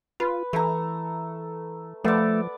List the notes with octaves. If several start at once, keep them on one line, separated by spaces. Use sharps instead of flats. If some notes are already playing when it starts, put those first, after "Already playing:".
F4 B4
E3 A3 A#5
F3 A3 B3 D5